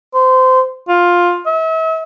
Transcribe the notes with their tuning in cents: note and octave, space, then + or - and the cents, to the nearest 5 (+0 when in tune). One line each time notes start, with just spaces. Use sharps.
C5 -25
F4 +10
E5 -40